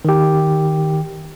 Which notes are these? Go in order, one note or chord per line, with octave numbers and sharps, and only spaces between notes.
D#3 G4